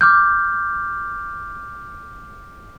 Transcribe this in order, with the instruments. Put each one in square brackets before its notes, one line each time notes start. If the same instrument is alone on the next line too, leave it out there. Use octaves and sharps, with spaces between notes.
[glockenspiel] D6 F6 G6